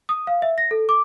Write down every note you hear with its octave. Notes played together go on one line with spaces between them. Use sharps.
D#6
F5
E5
A#6
A4
D6